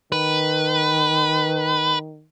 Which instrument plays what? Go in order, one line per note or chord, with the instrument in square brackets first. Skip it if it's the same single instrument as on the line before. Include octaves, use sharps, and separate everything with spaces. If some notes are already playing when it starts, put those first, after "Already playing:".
[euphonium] D#3 [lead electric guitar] B4